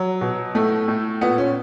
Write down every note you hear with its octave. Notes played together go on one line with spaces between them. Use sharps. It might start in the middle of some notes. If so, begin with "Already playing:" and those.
Already playing: F#3
B2
A2 A3
A2
A#2 B3
C#4